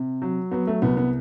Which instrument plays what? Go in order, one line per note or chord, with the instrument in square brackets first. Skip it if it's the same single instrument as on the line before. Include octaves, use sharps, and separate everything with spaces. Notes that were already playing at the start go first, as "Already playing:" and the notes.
Already playing: [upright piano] C3
F#3
F#3 B3
A3
C2 B3
B3